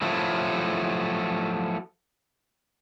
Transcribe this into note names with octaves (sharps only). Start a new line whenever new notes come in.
F3 F#3 A3 E4